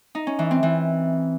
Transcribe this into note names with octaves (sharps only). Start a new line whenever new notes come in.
D#4
C#4
E3
C4
E3